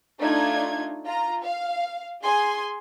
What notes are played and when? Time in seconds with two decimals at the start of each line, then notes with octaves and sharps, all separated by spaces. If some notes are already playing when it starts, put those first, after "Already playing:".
0.18 A3 D4 D#4 F4 G#6
1.07 F4 A#5
1.44 F5
2.23 G#4 G#5 C6